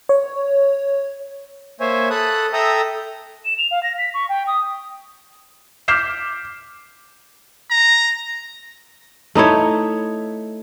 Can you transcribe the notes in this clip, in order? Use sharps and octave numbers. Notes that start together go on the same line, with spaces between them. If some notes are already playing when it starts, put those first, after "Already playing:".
C#5
A#3 C5 C#5 E5 G#5
A4 A5 B5 D#6 F#6
A4 E5 G5 A#5 D#6
E7
F7
F5
A#6
B6
C#6
G5
D#6
D6 F6 G6 B6 C7 E7
A#5
A3 D#4 E4 C#5